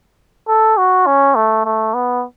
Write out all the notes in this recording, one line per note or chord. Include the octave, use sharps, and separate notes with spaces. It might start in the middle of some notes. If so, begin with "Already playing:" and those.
A4
F#4
C#4
A3
A3
B3